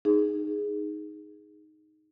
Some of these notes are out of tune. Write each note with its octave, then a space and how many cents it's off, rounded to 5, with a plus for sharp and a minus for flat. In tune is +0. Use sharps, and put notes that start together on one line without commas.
D#4 +0 G#4 +0